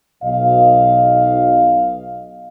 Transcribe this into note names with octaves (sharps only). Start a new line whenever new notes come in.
B1 B2 D#5 F5